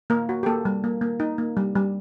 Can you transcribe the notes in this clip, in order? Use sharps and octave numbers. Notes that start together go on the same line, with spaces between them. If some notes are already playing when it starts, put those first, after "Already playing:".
A#3 A#4
F#4
G4
A#3 A4
G3
A#3
A#3
D#4
A#3
G3
G3